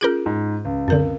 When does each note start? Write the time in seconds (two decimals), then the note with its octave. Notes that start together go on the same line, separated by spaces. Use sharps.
0.01 C#4 F4 G#4 A#4 G6 D7
0.26 G#2
0.65 C#2
0.88 F#2 D3 C4 A#4